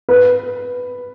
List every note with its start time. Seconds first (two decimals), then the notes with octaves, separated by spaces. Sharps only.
0.09 B4